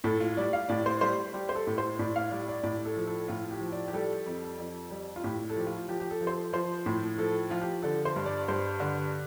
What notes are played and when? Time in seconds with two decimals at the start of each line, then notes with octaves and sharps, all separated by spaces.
0.04 A2 A4
0.20 F4
0.37 G3 D5
0.53 F5
0.69 A2 D5
0.86 C5
1.01 G3 C5
1.33 G3 G4
1.49 C5
1.55 A4
1.67 A2
1.78 C5
1.99 A2 D5
2.16 F5
2.31 G3 D5
2.48 D5
2.63 A2 D5
2.85 A4
2.96 F3
3.07 A4
3.28 A2 F4
3.51 G4
3.61 F3
3.72 D5
3.88 G4
3.93 G3 A4
4.26 F2
4.59 F2
4.91 G3
5.16 F4
5.24 A2 G4
5.49 A4
5.56 F3 G4
5.67 F4
5.88 F3 G4
6.00 G4
6.10 A4
6.21 F3
6.27 C5
6.31 A4
6.53 F3 C5
6.86 A2
7.18 F3 A4
7.50 F3 F4
7.62 G4
7.83 D3 A4
8.05 C5
8.16 G2
8.26 D5
8.48 G2 C5
8.80 D3